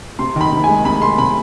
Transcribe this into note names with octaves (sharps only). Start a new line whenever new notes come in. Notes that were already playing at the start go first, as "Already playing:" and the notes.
C3 C6
D#3 B5
C3
G#3 G#5
C3 B5
G#3 C6
C3 B5